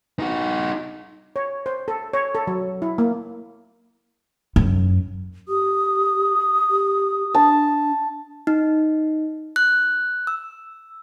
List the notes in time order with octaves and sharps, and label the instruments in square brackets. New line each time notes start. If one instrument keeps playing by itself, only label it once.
[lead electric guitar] D#4 F#4
[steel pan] C#5
C5
A4
C#5
A4
F#3
E4
A#3
[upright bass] F#2
[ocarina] G4 [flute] D#6
[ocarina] G4
[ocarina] D4 [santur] A5
[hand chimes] D#4
F#6
E6